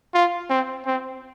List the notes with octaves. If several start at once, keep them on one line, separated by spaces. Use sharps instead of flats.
F4
C4
C4